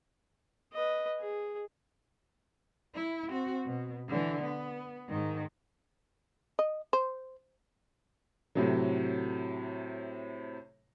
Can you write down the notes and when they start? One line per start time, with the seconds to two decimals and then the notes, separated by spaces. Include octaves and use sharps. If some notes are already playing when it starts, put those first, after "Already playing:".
0.73 B4 D#5
1.20 G#4
2.95 E4
3.29 C4 F#4
3.66 B2
4.08 D3 E3
4.43 B3
5.09 G#2 D#3
6.59 D#5
6.93 C5
8.55 A2 C3 F#3